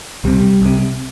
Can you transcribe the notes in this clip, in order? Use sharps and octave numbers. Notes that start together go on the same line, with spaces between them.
C2 C3 G3
C2 C3